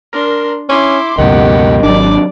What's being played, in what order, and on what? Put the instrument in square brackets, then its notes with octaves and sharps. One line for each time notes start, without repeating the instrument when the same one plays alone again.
[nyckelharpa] D4 C6 [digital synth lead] A#4
[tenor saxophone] C#4 [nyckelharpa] E4 C6 [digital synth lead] D6
[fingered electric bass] C#2 F#2 B2 [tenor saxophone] D#3 [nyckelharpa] G4 [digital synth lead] F#5
[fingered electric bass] G#1 F#3 [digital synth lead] D4 [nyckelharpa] D5 D6